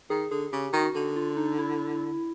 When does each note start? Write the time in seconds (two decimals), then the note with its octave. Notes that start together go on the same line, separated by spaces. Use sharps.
0.10 D#3 G#4
0.31 D3 G#4
0.53 C#3 G4
0.73 D#3 F#4
0.95 D3 F#4
1.16 F4
1.37 D#4
1.59 E4